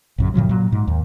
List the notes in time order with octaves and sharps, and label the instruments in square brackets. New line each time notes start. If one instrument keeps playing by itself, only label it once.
[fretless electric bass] A#1 F#2 C#3
A2 C#3 F3 F#3
A#2 F#3
G#2
D#2